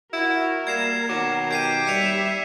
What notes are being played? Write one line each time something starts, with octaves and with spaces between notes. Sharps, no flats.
E4 F#4 A#4
G3 A#3 G#6 C7 E7
B2 D#3 F#3 D6
G4 G#6 C7 D#7
D#2 G3 E5 B6 C#7 F7